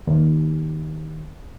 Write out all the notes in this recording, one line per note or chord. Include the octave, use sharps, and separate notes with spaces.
D#2